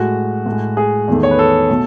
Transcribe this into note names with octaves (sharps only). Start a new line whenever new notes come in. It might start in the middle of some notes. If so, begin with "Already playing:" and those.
Already playing: A2 G#3 F#4
A2 G#3
G#4
E2 D#3 A3
C#5
B4
A4
B2 A3